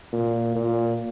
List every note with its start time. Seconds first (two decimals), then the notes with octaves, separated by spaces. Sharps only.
0.13 A#2
0.55 A#2